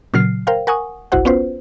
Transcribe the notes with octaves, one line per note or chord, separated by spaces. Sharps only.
A#2 C#3 F#3 F6 C7
A#4 C5 F5 G5
A#4 F#5 G#5 C#6 D#6
G1 C2 E4 F#4 C5 F#5
B3 C#4 F4 B4 C5